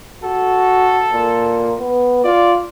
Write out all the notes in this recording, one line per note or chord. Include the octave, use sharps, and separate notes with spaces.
F#4 A4
A#2
B3
F4 D5